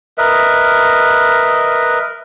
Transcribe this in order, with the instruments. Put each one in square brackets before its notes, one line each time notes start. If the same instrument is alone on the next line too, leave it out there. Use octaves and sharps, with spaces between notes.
[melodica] A#4 B4 D#5 E5